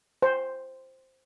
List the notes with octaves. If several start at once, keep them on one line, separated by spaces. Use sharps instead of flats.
C5